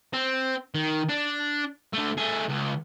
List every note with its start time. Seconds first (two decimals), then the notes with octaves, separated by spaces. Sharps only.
0.13 C4
0.75 D#3
1.09 D4
1.93 D3 A3
2.17 A3 G#4
2.49 C#2